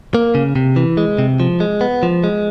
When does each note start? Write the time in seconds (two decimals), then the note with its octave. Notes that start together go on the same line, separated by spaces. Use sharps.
0.15 A#3
0.35 C#3
0.56 C3
0.76 E3
0.97 G#3
1.18 C3
1.40 F3
1.60 G#3
1.81 B3
2.03 F3
2.24 G#3